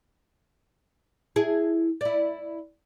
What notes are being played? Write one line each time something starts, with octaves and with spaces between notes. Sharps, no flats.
E4 G#4
E4 D5